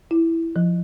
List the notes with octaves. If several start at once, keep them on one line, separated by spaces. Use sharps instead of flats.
E4
F3